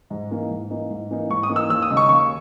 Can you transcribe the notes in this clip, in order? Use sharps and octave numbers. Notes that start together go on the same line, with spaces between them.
G#2
E3 A#3 D#4
G#2
E3 A#3 D#4
G#2
E3 A#3 D#4
G#2 C#6
D#6
E3 A#3 D#4
E6
D#2 E6
D#6
C#3 G#3 D#4
C#6
D#2 C#6